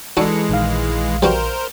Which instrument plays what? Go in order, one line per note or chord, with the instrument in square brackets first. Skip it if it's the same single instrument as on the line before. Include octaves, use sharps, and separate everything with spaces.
[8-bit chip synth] E3 G#3 [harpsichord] D4 D#4 F#4 [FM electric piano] A4 C#7
[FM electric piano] A#1 D#3 F5
[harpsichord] G3 B3 F#4 [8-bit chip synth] A#4 C5